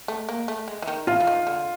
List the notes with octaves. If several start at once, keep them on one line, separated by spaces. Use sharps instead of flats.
A3
A#3
A3
G#3
E3
D#3
E3 F4
E3
D#3
D3